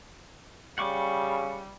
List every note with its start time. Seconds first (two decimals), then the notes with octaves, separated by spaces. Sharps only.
0.78 C#3 G3 F#5 C#6 D6